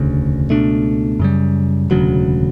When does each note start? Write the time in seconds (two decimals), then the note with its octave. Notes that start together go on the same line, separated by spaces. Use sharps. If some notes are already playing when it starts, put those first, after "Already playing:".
Already playing: E1 D2 C#3
0.50 C#2 B2 A3 D4
1.19 F#2 C#3 G3
1.90 E1 D2 C#3 F#3